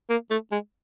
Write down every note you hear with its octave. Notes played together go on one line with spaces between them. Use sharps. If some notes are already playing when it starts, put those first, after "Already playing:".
A#3
A3
G#3